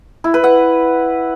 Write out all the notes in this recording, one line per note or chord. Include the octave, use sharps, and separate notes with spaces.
E4
B4
F#5